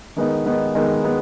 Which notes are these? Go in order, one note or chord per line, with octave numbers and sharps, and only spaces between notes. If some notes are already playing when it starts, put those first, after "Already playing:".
D#3 G#3 B3 D#4
D#3 G#3 B3 D#4
D#3 G#3 B3 D#4
G#3 B3 D#4